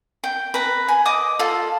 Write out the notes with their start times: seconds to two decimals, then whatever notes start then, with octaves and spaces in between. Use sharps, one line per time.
0.24 G5
0.54 B4 A#5
0.88 G#5
1.05 D#5 D6 D#6
1.39 F4 A4